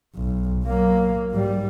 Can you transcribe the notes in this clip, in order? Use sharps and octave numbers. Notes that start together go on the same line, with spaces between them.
B1
F#3 A#3
G#2 G3